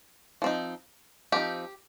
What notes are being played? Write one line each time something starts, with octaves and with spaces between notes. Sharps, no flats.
F3 C4 D#4
F3 C4 D#4 G4